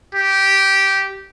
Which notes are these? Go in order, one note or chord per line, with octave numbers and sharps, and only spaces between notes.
G4